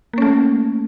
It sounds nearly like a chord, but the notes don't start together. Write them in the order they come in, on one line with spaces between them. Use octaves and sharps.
A#3 C#4 A3